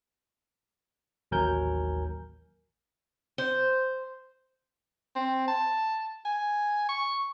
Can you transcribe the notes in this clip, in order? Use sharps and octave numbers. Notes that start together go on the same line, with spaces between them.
A1 D#2 F#3 A#4 G#5 G6
C5
C4
A5
G#5
C#6